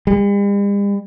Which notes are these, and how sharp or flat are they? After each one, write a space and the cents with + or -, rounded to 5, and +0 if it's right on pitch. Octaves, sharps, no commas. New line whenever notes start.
G3 +45